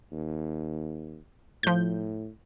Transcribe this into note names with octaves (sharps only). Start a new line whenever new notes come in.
D#2
A2 F3 G6